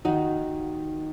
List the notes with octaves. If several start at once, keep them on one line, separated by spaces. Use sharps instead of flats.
D#2 D#3 D#4 F#4